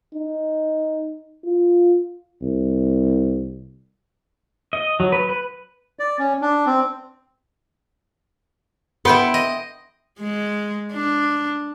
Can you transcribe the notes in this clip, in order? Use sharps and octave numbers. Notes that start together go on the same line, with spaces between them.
D#4
F4
C2
D#5
F#3
B4
B4
D5
C#4
D4
C4
B3 E4 G5 C6
D#5
G#3
D4